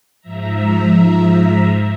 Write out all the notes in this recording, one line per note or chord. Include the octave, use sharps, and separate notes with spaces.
G#2 F3 E5 A#5